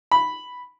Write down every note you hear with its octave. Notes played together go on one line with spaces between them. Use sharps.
B5